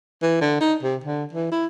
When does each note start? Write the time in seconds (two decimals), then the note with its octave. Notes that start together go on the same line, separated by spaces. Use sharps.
0.22 E3
0.41 D3
0.60 D#4
0.83 C3
1.04 D3
1.33 E3
1.52 E4